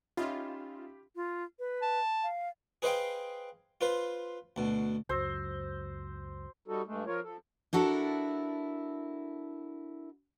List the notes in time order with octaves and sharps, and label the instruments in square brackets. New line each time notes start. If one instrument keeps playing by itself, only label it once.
[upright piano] C#4 D#4 E5 [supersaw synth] F4 [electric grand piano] G4 B5
[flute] F4
B4
[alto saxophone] A5
[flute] F5
[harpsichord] G#4 B4 C5 D#5 F5 G5
F4 B4 C5
D2 B2
[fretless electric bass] C#2 F#2 [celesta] F#4 E6 A#6 [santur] C5
[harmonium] G3 D#4 F#4 A4
G2 G#3 A3
F3 F4 A#4 C#5
F3 A4
[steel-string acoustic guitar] D4 E4 F#4 A4 A#4